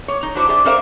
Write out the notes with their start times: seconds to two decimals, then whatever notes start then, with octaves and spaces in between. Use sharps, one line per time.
0.08 C#5
0.23 D#4
0.35 D4 E4 F#4 C5 D5
0.48 G4 G#4 C5 D5 E5
0.65 A4 A#4 C5 D5 E5 F5